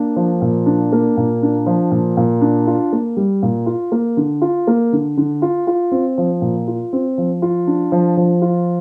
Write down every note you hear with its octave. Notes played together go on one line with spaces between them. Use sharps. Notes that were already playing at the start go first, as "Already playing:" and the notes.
Already playing: A#3 D4
F3
A#2
D4
A#3
A#2
D4
F3
A#2
A#2
D4
F4
A#3
G3
A#2
F4
A#3
D3
F4
A#3
D3
D3
F4
F4
C4
F3
A#2
F4
C4
F3
F4
D4
F3
F3
F4